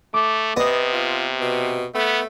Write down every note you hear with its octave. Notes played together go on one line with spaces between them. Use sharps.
A3 D6
C3 B3 D#5
F4
B2
A3 B3